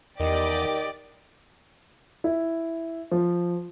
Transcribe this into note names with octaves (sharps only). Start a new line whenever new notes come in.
E2 D#3 G4 D5 D#5 D6
E4
F3